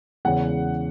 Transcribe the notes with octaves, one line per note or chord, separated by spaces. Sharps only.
E2 C#3 E3 G#3 C#4 F#5